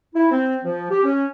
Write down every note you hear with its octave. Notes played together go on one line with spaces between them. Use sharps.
E4
C4
F3
G4
C#4